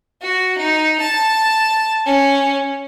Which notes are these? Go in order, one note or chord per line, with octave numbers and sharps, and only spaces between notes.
F#4
D#4
A5
C#4